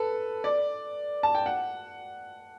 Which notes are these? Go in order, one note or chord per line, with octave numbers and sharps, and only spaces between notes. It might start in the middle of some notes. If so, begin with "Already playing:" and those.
Already playing: A4 B4
D5
A5
G5
F#5